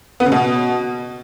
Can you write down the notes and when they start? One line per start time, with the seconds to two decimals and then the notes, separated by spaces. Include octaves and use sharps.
0.20 B3
0.26 C#3
0.32 B2